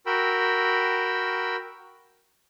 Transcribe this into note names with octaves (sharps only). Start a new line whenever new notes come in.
F#4 A#4 G5 B5 E6